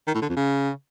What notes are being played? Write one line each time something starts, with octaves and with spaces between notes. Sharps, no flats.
D#3
A2
D3
F2
C#3